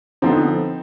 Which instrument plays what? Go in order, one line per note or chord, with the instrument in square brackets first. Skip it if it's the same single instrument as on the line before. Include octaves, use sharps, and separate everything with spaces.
[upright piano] D3 F3 B3 C4 D#4